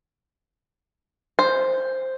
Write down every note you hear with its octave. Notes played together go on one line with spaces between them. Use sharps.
C5